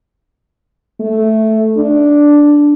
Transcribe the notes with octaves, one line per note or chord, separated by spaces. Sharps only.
A3
D4